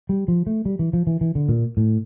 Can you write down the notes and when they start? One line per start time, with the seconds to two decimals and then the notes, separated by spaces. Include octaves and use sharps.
0.09 G3
0.28 F3
0.47 A3
0.65 G3
0.79 E3
0.93 F3
1.07 E3
1.21 E3
1.35 D3
1.49 A#2
1.77 A2